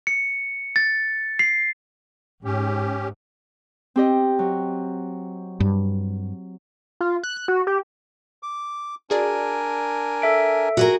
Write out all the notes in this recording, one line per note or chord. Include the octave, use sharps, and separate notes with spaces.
C#7
A6
C7
G#2 C#4 G4
C4 G4 D#5
F#3
G2
F4
F#6
F#6
F#4
G4
D6
D4 F#4 G#4 A#4 D5 G#5
A4 E5 D7
A#2 F#4 G#4 A#4